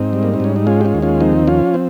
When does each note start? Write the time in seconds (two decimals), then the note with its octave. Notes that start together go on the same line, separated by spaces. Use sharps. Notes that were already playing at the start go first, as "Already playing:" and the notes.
Already playing: G#2 C4 D#4
0.13 G3
0.23 A#3
0.34 C4
0.40 G#2 C#4
0.56 D#4
0.67 G#3 C#4 F4
0.81 G4
0.85 C#4 F4
0.95 D#2
1.02 C#4 F4
1.20 F3 C4 D#4
1.47 F3 C#4 F4
1.74 C4